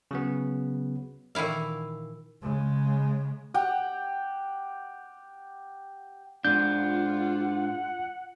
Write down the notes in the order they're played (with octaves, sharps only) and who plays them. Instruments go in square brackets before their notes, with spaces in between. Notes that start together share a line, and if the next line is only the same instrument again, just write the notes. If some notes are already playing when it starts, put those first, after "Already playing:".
[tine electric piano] C#3 F#3 B3
[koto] A#2 D#3 E3 E4 F5
[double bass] C#3 G#3
[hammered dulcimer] G4 F#5 G5
[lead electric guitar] G#2 D4 [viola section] F4 [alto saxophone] F#5 [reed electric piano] G6